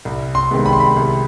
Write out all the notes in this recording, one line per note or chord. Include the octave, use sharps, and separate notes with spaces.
C2
C6
C3 D#3 G#3 B3
B5
C6
B5
C2